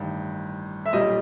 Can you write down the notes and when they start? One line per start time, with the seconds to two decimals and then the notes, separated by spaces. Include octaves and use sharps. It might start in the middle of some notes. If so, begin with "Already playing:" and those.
Already playing: A1 G2 D#3
0.86 E5
0.93 B1 A#2 G3 D#5